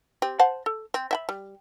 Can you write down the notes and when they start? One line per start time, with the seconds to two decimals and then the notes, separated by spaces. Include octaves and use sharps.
0.22 C4 G4
0.39 C5 F#5 A5
0.66 A4
0.94 C4
1.11 E5 G5 B5
1.29 G3